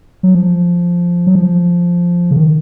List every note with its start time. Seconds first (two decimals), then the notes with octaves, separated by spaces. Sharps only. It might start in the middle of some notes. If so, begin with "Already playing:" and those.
0.23 F#3
0.35 F3
1.27 F#3
1.35 F3
2.31 C#3
2.36 D#3